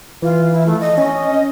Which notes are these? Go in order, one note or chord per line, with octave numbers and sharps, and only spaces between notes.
E3 F4
E4
A3
D#5
C#4 D#5